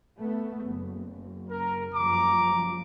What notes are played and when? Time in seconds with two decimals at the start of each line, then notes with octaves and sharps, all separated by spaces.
0.19 A3 B3
0.64 F#1
1.50 A#4
1.95 F#1 G2 F3 A#5 D6